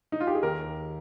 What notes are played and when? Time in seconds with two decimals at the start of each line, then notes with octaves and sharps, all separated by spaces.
0.12 D#4
0.20 F4
0.27 G4
0.35 G#4
0.43 D#2 A#4